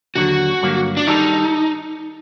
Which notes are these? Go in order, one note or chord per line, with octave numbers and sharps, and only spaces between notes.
D#2 D3 F#3 F#4
G2 D3 F#3 A#3
D4
D#3 G3 D4 D#4 A4